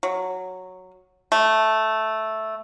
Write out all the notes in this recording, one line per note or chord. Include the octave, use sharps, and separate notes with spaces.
F#3
A3